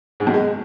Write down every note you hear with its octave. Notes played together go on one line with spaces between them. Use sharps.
G#2
F#2
G#3